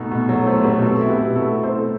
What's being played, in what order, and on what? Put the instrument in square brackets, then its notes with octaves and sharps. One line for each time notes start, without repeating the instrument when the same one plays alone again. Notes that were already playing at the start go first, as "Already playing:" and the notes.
Already playing: [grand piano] B2 A3 D#4
B2
[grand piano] F#3 [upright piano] F#4 A4
[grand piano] A3 [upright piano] A4 C5
[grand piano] B2 [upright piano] G4 B4
[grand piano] C4 [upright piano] F#4 A4
[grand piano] E4
[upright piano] G4 B4
[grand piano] B2
[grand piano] A3 [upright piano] F#4 A4
[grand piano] C4
[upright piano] A4 C5
[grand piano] E4